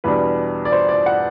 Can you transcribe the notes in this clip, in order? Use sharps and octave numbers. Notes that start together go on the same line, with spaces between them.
E2 B2 G3 D4 B4
D5
C5
D5
F#5